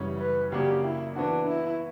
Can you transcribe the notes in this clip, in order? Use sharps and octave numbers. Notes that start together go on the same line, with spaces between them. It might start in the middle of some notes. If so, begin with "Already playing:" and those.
Already playing: F#2 C#3 E3 G3 C#4
B4
C#3 F#3 A#3 D4 G4
E4
E3 B3 D4 F#4
E4